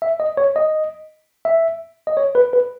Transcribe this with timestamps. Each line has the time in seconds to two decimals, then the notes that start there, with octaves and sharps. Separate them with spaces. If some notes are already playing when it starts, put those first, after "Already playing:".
0.02 E5
0.20 D#5
0.37 C#5
0.56 D#5
1.45 E5
2.07 D#5
2.17 C#5
2.35 B4
2.53 B4